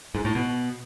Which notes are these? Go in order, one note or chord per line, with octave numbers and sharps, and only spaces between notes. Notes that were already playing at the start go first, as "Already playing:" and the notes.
G#2
A2
B2